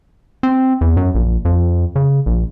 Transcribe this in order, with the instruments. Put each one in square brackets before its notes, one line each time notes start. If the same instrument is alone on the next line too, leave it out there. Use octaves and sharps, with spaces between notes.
[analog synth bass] C4
E2
F#2
A#1
F2
C#3
A#1